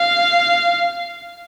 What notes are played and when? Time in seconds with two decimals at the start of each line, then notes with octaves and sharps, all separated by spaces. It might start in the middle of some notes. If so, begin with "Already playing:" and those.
Already playing: F5